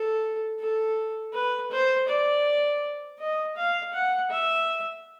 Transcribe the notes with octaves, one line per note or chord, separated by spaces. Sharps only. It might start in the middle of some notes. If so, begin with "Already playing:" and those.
Already playing: A4
A4
B4
C5
D5
D#5
F5
F#5
E5